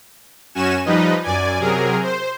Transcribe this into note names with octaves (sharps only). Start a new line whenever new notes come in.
F#2 C#4 F#4 G#5 E7
F3 G3 D#4 B4 D#5
F#2 D5 G#5
C3 F#3 G#4 A#4
C5